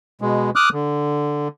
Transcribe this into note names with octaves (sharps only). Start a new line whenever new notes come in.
B2 G#3
D6 D#6 F6 F#6
D3